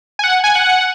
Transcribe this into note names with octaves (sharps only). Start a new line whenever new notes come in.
G#5
F#5
G#5
F#5